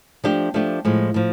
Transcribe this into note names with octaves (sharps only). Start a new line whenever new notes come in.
F3 A3 D4 G4
F3 A3 D4 G4
A2 F3 G#3
A2 F3